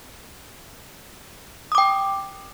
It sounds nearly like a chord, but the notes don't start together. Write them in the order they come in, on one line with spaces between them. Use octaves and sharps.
D#6 D6 G5